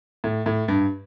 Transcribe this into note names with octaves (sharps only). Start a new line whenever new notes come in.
A2
A2
G2